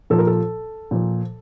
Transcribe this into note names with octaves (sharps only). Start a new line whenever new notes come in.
A#2 F3 A4
A#4
A4
A#2 F3